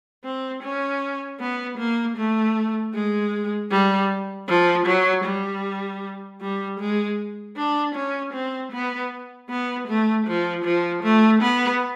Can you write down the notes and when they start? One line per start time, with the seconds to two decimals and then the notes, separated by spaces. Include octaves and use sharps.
0.24 C4
0.62 C#4
1.39 B3
1.78 A#3
2.17 A3
2.94 G#3
3.71 G3
4.48 F3
4.86 F#3
5.25 G3
6.41 G3
6.79 G#3
7.56 D4
7.95 C#4
8.33 C4
8.72 B3
9.49 B3
9.87 A3
10.26 F3
10.65 F3
11.03 A3
11.42 B3